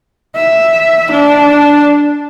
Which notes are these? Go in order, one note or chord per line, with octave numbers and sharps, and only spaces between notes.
E5
D4